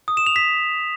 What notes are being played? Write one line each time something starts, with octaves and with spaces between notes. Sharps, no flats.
D#6
E7
F7
B6